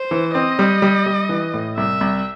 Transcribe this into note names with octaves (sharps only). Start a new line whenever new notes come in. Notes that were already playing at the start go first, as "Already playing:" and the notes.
Already playing: C5
E3
C4 D#5
G3
G3
G3
E3
A2
C2 E5
C2